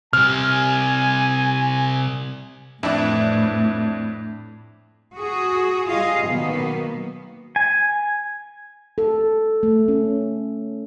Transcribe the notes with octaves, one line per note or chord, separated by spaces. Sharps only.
C3 G3 G#5 F6
F2 A2 E3 D4 E4
F#4 G#4
G3 F4 G#4 D#5 F5
B2 D#3 F#3 A#3 B3
G#5
A4
A3
C#4